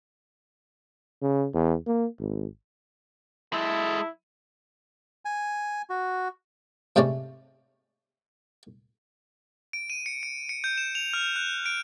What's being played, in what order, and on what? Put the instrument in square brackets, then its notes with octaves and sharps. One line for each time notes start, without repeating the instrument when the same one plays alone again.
[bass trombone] C#3
E2
A#3
G#1
[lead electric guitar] G#3 A4 [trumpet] E4
[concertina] G#5
F#4
[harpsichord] G#2 C3 A3 C#4 D5
[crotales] D7
D#7
C#7
D7
C#7
G6
E7
F7
F6
F#6
D7